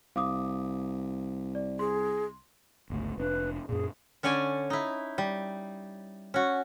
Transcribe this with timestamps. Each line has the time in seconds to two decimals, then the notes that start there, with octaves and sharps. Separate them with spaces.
0.16 C2 F5 D6 D#6
1.55 D5
1.79 G#4 C6
2.90 G1 C#2 A3
3.18 F1 C4 D4 B4
3.69 F#2 A#2 G#4
4.23 D3 C#4 C#5 D5 G#5
4.70 D#4 E4
5.18 G3
6.34 C#4 F#4